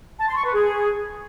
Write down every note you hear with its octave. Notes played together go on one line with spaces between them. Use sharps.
A5
C6
C#6
B4
G#4